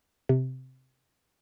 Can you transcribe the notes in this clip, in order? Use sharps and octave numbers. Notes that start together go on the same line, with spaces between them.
C3